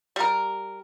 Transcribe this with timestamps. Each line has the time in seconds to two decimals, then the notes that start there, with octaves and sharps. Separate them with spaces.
0.16 G3 A#4